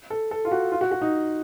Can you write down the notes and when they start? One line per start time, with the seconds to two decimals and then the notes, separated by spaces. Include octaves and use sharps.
0.10 A4
0.31 A4
0.45 F4
0.52 F#4
0.72 F4
0.81 F#4
0.91 F#4
1.02 D#4